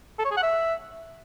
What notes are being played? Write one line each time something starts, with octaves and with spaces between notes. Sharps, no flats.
A4
C#5
G#4
F#5
E5